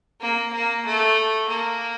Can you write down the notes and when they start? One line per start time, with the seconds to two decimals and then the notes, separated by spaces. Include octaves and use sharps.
0.21 A#3
0.53 A#3
0.85 A3
1.48 A#3